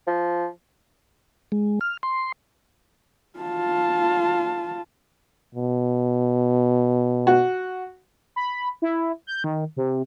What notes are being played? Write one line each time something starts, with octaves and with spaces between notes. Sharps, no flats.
F3
G#3
F6
C6
F4 A5
B2
F#4
B5
E4
G6
D#3
C3